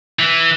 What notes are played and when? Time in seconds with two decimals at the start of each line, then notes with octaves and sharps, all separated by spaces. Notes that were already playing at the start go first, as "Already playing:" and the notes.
0.19 E3